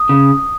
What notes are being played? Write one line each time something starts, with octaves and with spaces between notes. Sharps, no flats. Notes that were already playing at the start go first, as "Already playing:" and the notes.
Already playing: D#6
C#3